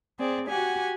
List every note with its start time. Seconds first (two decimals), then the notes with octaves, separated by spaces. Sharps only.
0.19 C4 G#4 D5
0.47 F#4 G4 F#5 G#5